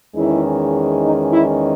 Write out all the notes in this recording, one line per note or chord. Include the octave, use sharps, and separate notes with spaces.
E2 D#3 G#3 C#4 E4
D#4
E4